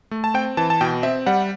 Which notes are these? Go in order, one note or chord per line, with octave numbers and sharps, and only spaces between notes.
A3
A5
C4 G5
E3 A5
A5
B2 G5
C4 E5
G3 F#5